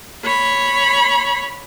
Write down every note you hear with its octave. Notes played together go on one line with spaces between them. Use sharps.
C#5 B5